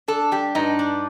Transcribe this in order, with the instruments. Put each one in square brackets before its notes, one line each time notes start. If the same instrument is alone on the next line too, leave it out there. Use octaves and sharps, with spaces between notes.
[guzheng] D4 [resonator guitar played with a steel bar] A4
[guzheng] G3 [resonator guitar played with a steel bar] G4
[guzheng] G2 [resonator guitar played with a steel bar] D#4
[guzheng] D4